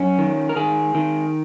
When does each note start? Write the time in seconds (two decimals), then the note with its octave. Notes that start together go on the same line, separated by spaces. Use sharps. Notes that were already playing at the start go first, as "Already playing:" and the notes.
Already playing: F#2 C#4
0.18 D#3
0.49 A#4
0.56 D#3 G#4
0.95 D#3